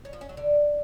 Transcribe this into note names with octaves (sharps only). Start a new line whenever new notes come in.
C#4
F3
C#4
F#3
D3